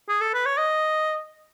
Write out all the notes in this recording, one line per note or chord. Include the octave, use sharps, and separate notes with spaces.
G#4
A4
B4
C#5
D#5